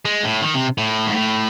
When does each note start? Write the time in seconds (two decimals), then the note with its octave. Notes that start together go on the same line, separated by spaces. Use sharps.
0.05 G#3
0.24 A2
0.42 D#3
0.54 C3
0.78 A2
1.07 G#2
1.14 A2